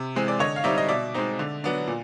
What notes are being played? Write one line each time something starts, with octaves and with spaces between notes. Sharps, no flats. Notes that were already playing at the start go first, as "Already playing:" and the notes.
Already playing: C3
E3 G#3 C4
D5
D3 C#5 D#5
F5
G3 C4 D#4 D5 E5
D#5
B2 D5 E5
G#3 C4 D#4
D3
F#3 B3 D4
A#2